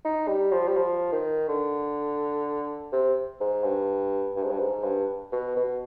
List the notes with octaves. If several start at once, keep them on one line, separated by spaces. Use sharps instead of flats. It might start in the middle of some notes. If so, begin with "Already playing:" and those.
D#4
G3
F3
G3
F3
D#3
D3
C3
G#2
G2
G2
G#2
G2
G#2
G2
B2
B2